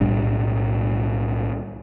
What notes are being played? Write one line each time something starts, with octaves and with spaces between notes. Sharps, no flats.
B1 A2 G3 D4